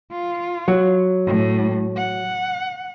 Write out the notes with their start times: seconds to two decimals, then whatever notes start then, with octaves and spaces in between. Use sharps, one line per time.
0.11 F4
0.68 F#3
1.25 A2
1.96 F#5